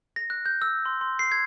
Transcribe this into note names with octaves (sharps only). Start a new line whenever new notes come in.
A#6
F#6
G6
E6
C6
C6
C7
G#6